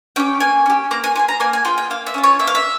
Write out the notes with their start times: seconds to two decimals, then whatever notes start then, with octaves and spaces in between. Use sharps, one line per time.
0.16 C#4 G4 G5
0.40 A#3 G#5
0.66 C#4 G4
0.91 A#3 A#5
1.04 G#5
1.15 F4 G#5
1.19 G#4
1.28 A#5
1.40 A#3 G#5
1.53 G#5
1.65 F4 G#4 G5
1.78 G5
1.90 A#3 F5
2.06 E5
2.14 C#4 F4
2.24 C#5
2.39 A#3 E5
2.47 F5
2.55 E5